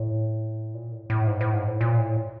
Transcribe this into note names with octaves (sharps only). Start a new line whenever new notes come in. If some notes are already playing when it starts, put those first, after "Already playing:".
Already playing: A2
A#2
A2
A2
G#2
A2
G#2
A2
A#2
A2